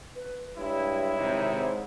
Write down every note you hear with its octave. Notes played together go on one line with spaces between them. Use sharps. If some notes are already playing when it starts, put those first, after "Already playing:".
B4
G2 G#3 E4 C#5
G#1 C3 D#4
G#2